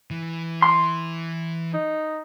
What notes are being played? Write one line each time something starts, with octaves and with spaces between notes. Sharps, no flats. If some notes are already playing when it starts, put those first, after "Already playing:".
E3
C6
D#4